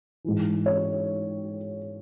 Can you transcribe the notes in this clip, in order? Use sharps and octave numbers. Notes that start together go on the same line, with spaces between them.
G#2 E3
C#5